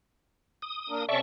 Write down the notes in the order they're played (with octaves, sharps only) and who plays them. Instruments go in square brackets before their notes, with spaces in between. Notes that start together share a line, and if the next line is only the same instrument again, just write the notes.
[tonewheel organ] D#6
[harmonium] A#3 D4 A#4
[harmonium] C3 C#4 A4 [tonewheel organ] D5 E5 C#6